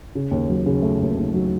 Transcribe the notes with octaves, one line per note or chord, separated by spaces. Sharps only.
C#3
D#2
F#3
C#3
A3
D#2
D#2
F#3